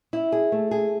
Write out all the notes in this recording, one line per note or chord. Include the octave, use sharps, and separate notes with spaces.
E4
G#4
A3
G#4